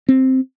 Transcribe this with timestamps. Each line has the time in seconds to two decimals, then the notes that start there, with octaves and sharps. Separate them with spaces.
0.09 C4